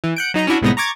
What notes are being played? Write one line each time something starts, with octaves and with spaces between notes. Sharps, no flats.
E3
F#5 G6 D7
F#3 D#4 D#5 A#5
C#4 D4 E4 F#4
C2 A2 G#3 B3 D#4 A#6
A#5 C#6 D6 G#6 A6